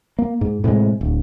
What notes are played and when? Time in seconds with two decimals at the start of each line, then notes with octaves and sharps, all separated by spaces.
0.19 A#3
0.41 G#2
0.64 A2 C3 E3 G#3
1.01 D1